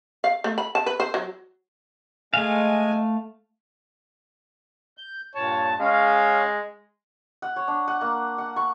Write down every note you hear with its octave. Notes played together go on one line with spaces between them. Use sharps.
F5
A3
B5
A5
B4
C5
F#3
G#3 A3 F5 G#5
G6
G2 A#2 C#5 A5
G#3 C#4 F5
F#5
C#5
D4
F#5
A#3
F#5
C#6